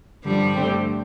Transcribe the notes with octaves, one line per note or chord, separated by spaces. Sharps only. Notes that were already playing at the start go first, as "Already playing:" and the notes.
G2 D3 F3 G3 D4
D3 A3 C4 G4 C5